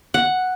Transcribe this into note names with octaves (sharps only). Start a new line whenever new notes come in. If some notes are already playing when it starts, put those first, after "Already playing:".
F#5